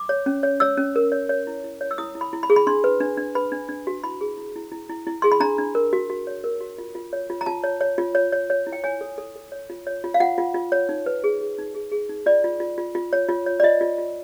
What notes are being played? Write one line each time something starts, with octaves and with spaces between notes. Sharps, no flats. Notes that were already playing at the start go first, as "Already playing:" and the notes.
Already playing: D6
C#5
C#4
C#5
C#5 E6
C#4
A#4
C#5
C#5
E4
E4
C#5
E6
E4 D#6
E4
B5
E4
B5
G#4
B5
D4 C6
B4
D4
D4
B4 B5
D4
D4
F#4
E4 B5
G#4
E4
E4
E4
E4
E4
G#4 C6
B5
D4 A#5
D4
A#4
F#4
F#4
C#5
A#4
F#4
F4
F4
C#5
F4
A#5
F4 A5
C#5
C#5
F4
C#5
C#5
C#5
E4
G5
C#5 G#5
A4
A4
A4
C#5
F4
C#5
F4
F5
F4 F#5
F4
F4
C#5
D#4
B4
G#4
G#4
D#4
G#4
G#4
D#4
F4 D5
F4
F4
F4
F4
C#5
F4
C#5
D5
F4 D#5
F4
F4